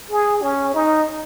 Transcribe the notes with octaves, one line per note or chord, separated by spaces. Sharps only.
G#4
C#4
D#4